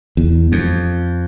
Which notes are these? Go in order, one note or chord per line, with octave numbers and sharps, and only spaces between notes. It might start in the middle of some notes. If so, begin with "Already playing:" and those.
E2
F2